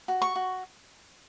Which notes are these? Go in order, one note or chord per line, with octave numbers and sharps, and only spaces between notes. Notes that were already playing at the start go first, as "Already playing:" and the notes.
F#4
C#6
F#4